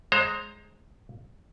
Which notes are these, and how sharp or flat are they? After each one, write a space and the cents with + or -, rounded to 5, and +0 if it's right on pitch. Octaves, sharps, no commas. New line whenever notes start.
G#3 +10 C5 +30 A#5 -10